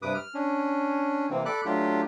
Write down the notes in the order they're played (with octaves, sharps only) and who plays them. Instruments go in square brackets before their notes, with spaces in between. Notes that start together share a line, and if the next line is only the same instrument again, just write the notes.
[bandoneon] G2 C3 B4 D6 D#6
F6
C#4 D4
C3 E3 A#3 C4
A4 D5 B5 D6 F#6
F#3 A3 D4 F4 G4